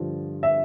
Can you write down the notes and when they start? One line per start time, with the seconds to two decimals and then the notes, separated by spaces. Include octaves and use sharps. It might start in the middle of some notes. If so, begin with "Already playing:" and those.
Already playing: G2 D3 F3
0.43 E5